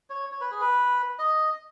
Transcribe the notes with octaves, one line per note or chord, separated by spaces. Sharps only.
C#5
C#5
B4
G#4
B4
D#5